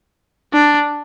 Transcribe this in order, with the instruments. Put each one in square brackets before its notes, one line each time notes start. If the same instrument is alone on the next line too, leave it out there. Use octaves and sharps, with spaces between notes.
[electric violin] D4